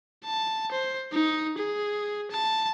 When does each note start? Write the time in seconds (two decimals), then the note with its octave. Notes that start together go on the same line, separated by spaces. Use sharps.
0.25 A5
0.72 C5
1.12 D#4
1.58 G#4
2.31 A5